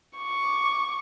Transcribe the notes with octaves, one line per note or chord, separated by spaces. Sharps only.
C#6 D6